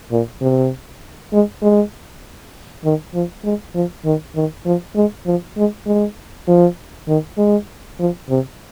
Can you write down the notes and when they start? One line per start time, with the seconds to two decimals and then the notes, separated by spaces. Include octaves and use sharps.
0.12 A#2
0.41 C3
1.33 G#3
1.62 G#3
2.84 D#3
3.14 F3
3.44 G#3
3.75 F3
4.05 D#3
4.36 D#3
4.65 F3
4.96 G#3
5.26 F3
5.57 G#3
5.87 G#3
6.48 F3
7.08 D#3
7.38 G#3
7.99 F3
8.29 C3